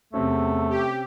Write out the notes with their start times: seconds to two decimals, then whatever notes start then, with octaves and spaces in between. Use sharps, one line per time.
0.14 E2 C3 A3 C4 C#4
0.70 G4